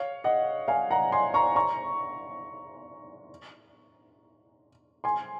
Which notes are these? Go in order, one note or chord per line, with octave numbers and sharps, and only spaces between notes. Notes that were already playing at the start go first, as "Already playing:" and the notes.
Already playing: C#5 F5
D#5 F#5
F5 G#5
F#5 A#5
G#5 C6
A#5 C#6
A#5 C#6
G#5 C6